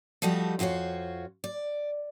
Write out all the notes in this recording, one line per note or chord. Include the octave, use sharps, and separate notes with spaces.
F3 G3 A3 F#4 G4 D#5
F2 F4 F#4 C5 C#5
D5